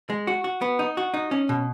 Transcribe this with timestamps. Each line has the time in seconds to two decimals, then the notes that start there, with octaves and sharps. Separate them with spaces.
0.10 G#3
0.27 F#4
0.44 F#4
0.62 B3
0.79 D#4
0.97 F#4
1.14 D#4
1.31 C#4
1.49 B2